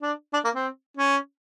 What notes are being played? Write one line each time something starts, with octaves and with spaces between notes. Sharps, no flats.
D4
D4
A#3
C4
C#4